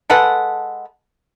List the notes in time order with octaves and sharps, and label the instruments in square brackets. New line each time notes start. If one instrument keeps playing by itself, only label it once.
[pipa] G#3 A4 B4 F#5